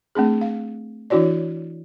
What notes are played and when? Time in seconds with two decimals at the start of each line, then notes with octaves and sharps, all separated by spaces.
0.15 A3 C4 D4 G#4
0.41 F5
1.10 E3 D4 E4 F#4 C#5 D5